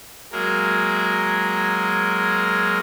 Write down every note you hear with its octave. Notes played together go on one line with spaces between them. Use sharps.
F#3 G#3 A#3 A#4